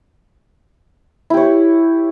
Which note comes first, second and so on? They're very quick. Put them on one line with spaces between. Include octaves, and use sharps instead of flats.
E4 G4 C#5